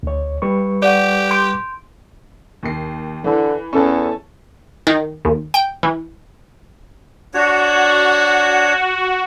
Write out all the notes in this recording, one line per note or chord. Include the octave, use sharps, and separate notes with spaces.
D2 C#5
G3 B4 C#6
G4 D5 F#5
C6 G6 D7
D#2 C7
D3 E3
E2 C#4 A4 A5
D#3
D#2
G5
E3
D4 F#4 C#5